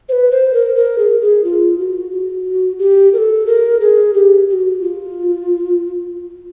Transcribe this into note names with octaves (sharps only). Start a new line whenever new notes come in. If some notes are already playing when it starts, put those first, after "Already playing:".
C5
B4
C5
A#4
A#4
G#4
G#4
F4
F#4
F#4
G4
A#4
A4
A#4
G#4
G4
G4
F#4
F4